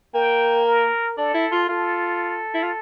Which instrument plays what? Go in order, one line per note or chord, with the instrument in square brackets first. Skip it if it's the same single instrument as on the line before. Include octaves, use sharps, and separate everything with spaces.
[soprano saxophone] A#3 [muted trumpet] G5
[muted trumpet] A#4
[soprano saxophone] D4 [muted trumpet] A4
[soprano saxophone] E4
F4
[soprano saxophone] F4 [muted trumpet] A4
[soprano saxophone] E4
F4